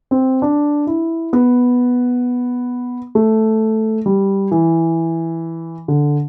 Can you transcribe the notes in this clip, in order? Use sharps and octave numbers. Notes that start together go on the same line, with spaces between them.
C4
D4
E4
B3
A3
G3
E3
D3